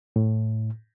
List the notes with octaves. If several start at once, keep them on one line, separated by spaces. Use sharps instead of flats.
A2